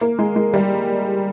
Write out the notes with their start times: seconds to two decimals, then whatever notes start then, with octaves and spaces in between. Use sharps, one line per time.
0.01 A#3
0.19 G#3
0.36 G#3
0.54 G3